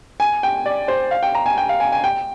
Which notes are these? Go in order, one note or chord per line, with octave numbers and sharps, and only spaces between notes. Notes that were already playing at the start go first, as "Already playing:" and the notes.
G#5
G5
D5
C5
F5
G5
A#5
G#5
G5
F5
G#5
G#5
G5